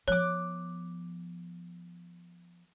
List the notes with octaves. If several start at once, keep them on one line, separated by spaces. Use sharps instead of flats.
F3 B3 C#5 D6 F#6